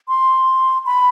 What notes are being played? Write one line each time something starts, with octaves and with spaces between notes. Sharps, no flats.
C6
B5